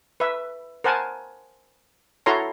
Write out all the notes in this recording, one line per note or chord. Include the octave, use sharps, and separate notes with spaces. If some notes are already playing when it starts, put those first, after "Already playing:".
B4 E5
A#4 C5 F#5 G#5 A5
E4 F#4 A4 C#5 A#5 C6